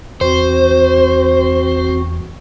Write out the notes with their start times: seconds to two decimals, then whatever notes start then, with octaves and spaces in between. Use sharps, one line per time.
0.21 E2 C4 F#4 C5